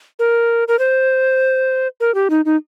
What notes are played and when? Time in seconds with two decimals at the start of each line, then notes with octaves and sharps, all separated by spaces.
0.19 A#4
0.68 A#4
0.79 C5
2.00 A#4
2.15 G4
2.30 D#4
2.45 D#4